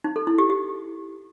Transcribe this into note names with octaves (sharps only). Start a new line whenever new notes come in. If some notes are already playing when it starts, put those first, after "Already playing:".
D#4
A4
E4
G4
G4